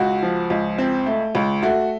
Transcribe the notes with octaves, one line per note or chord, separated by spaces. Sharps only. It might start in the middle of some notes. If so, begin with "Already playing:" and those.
Already playing: C#2 F#4
F3
C#2
C4
A3
C#2
A3 F#4